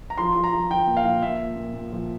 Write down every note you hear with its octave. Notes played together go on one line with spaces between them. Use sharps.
A#5
F3 C6
F3
A#5
F3
F3 G5
A#2
F5
F3
A#2 E5
A#2
A#2
A#2
F3